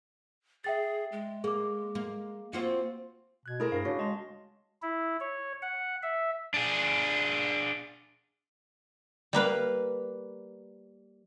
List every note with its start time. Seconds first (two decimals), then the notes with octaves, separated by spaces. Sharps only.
0.64 G#4 E5 G5 A6
1.12 G#3
1.44 A#3 G#4 D6
1.95 A#3
2.53 A#3 C4 F4 F#4
3.46 B2 F#6 G#6
3.60 A3 E4 G#4 A#4 C5
3.72 G2 F5 A#6
3.85 C#3 D4 F#4
3.99 G#3 D#5 A5 C6
4.82 E4
5.20 C#5
5.62 F#5
6.03 E5
6.54 D4 G#4
9.33 G3 A#3 B4 F5